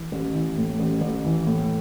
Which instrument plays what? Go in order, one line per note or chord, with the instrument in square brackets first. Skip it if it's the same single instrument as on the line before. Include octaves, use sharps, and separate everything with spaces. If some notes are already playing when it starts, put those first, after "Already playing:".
Already playing: [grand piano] E3
A1
E3
A2
A1
A1
E3
A2